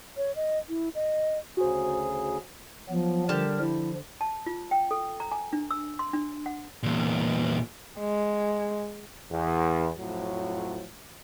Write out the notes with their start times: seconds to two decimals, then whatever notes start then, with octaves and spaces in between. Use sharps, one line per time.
0.17 C#5
0.36 D#5
0.69 E4
0.95 D#5
1.57 D2 C#3 F#4 G#4 C5
2.89 F3 F#3 B3
3.29 D3 G3 G4 A#4 A5
3.59 F3 E4
4.21 A5
4.46 F4
4.71 G5
4.91 A4
5.20 A#5
5.32 G#5
5.53 D4
5.71 E6
5.99 C6
6.13 D4
6.46 F#5
6.83 E2 A#2
7.98 G#3
9.30 E2
9.98 F2 A2 F3 F#3